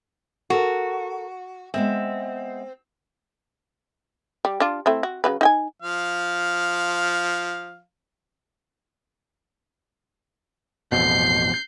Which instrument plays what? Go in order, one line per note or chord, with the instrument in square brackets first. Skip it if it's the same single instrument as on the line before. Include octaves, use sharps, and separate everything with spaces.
[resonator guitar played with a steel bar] F#4 [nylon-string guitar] A4 A#4
[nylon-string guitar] G#3 B3 E5 [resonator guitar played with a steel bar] C4
[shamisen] G3
D4 F4
A3 C4 E4
F#4
C#3 F#3 B4
D#4 G5 G#5
[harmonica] F3 F5
[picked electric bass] A1 F2 B2 [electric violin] G6 C7